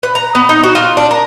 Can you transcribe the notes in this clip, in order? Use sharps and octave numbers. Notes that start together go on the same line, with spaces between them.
B4
A#5
B3
D#4
F#4
F4
D4
A#4